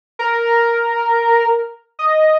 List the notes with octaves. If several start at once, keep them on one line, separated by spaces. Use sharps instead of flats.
A#4
D#5